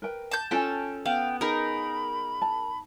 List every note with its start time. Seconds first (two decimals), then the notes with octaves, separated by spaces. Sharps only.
0.02 A#4 B4 G5
0.31 A5 G6
0.51 C#4 F4 A4 G5 G#5
1.06 B3 F5 G5
1.41 D#4 G#4 A#4 B5
2.42 A5